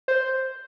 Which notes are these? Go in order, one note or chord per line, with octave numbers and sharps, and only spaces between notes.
C5